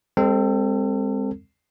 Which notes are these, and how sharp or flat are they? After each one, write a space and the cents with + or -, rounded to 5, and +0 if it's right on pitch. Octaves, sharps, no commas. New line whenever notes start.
G#3 -35 C4 +0 A4 +35